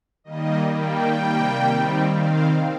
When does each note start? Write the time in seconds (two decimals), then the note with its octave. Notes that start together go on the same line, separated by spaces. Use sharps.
0.24 D#3 G3 A#3 D#5
0.71 D#3 G3 A#3 G5
1.18 C3 G3 A#3
1.65 D#3 G3 C4
2.11 D#3 C4 F5